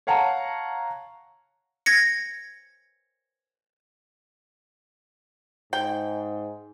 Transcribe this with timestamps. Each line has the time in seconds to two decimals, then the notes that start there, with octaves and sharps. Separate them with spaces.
0.07 C#5 F5 F#5 A5 A#5
1.86 G#6 A#6 C#7
5.73 G#2 G5